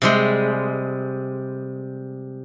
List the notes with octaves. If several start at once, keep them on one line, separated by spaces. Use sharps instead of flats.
C3 G3 G#3